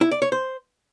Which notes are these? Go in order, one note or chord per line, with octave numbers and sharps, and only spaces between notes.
E4
D5
C#5
C5